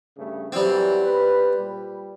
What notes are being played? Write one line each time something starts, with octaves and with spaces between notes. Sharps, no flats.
G2 C#3 A3
E2 E3 F#3 G3 C4
B4
A#2 G3